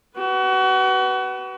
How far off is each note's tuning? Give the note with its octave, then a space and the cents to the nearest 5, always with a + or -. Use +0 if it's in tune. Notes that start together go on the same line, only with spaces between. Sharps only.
F#4 +30 B4 +0